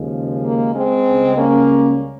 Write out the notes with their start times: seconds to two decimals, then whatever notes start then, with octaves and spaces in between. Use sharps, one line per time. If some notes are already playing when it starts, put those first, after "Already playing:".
Already playing: D#2 C#3 F3 G#3
0.46 A#3
0.75 G#3 C4
1.06 C#2 C#3 G3
1.37 A#3 C#4